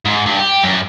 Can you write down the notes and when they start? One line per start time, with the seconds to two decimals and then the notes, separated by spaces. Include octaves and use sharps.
0.05 G#2
0.26 G2
0.39 G4
0.63 F#2